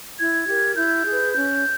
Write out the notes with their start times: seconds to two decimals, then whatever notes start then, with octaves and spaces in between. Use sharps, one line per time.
0.19 E4 G#6
0.48 G4 A#4
0.77 E4 G6
1.06 G#4 B4
1.35 C#4 G6